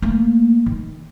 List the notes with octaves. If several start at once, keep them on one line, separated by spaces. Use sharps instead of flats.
A3 A#3
D#3